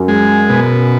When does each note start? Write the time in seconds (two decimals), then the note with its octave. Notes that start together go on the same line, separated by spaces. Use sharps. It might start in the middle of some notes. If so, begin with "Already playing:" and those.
Already playing: F#2
0.08 G#3
0.50 B2